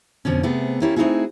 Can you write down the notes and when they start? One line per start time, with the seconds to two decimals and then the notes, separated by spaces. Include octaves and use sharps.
0.25 F2 B2 D3 C#4
0.43 C3 A3 B3 G#4
0.82 A#3 C#4 E4 G4 A4
0.96 A3 C4 D#4 E4 F#4 G#4